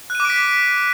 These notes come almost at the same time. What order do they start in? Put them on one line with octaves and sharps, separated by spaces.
F#6 D#7 D6 D7 B6